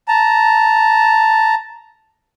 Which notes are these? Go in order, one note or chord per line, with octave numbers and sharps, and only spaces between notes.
A5 A#5